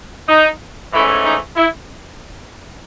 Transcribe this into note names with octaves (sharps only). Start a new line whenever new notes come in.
D#4
G#2 E3 A3 C#4 E4
D#4
E4